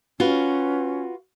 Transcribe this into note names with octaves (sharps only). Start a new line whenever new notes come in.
C#4 F4 F#4 B4